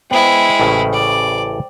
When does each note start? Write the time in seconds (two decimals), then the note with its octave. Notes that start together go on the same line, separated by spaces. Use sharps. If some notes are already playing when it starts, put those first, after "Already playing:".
0.11 G#3 B3 E4 C5 G5
0.59 A1 A2 C#3
0.93 D5